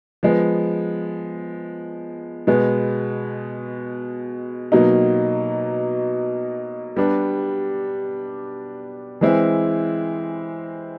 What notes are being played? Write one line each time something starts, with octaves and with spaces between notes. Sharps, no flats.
F3 G#3 B3
B2 G#3 B3
B2 F#3 A#3 D#4
G3 B3 D4
E3 G#3 C4 E4